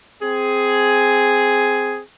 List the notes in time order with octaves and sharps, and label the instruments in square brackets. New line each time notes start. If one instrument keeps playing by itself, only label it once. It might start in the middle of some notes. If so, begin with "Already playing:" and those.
[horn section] C4 G#4